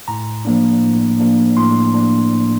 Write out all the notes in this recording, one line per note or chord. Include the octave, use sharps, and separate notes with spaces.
A2 A#5
F3 A#3 D4
A2
F3 A#3 D4
A2 C6
F3 A#3 D4
A2